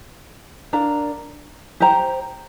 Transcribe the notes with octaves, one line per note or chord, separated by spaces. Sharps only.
D4 A#4 F5 A#5
G4 C5 G5 A#5